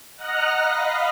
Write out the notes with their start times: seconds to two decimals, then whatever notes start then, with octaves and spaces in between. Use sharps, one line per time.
0.16 D#5 F#5 A#5 F6 F#6 A#6
0.59 D#5 F5 B5